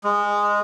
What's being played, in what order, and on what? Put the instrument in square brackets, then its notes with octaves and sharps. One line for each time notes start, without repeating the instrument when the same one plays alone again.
[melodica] G#3